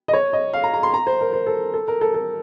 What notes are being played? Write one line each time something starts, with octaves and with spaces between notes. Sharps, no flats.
D#5
C#5
D#5
F5
A#5
A#5
C6
A#5
C5
A#4
C5
A4
A4
A#4
A4
A4